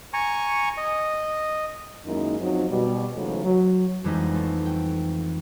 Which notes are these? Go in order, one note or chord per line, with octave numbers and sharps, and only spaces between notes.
G#5 A#5 C#6
D#5
F#2 D#3 G#3 A#3 D#4 E4
F#2 F3 F#3 C4 D#4
B2 G3
D2 G#2 C#3 E3 F#3 A3
F#3
F2 E3 G3 G#3 B3 D#4
A3
G5